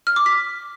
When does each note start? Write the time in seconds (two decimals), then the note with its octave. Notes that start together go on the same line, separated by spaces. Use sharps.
0.07 F6
0.16 D6
0.26 B6